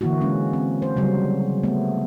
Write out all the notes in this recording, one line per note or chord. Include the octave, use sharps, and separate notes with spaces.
D3 E3 A#3 E4 F#4
G#3 C#4
C4
C5
C#3 F#3 G3
A3 B3